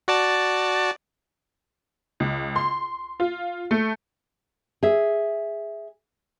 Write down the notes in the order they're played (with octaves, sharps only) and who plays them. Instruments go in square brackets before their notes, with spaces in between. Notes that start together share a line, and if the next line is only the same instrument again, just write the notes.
[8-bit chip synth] F#4 D5 A5
[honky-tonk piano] C#2
C6
F4
A3
[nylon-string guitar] G#4 E5